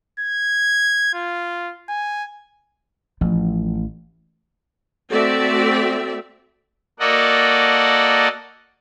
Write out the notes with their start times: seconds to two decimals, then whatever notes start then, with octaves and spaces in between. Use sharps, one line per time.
0.20 G#6
1.14 F4
1.89 G#5
3.21 A1 F3
5.11 A3 C4 F#4 D5 E5
7.00 A#3 F#4 A4 D5 D#5 F#5